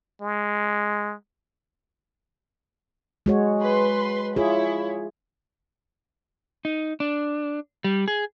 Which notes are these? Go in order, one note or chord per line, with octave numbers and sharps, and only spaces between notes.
G#3
G#3 F#4 C#5
B4 C6
E4 F4 G#4 C#5
D#4
D4
G3
G#4